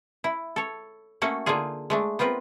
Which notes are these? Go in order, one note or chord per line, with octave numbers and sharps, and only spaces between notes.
E4
A4 C#5
A3 A#3 C#4 F#4 A4
D3 A#3 D#4 F4 G#4
G#3 A3 D4
B3 C4 F4 A#4 B4